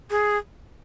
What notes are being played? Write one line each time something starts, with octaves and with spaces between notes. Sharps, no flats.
G#4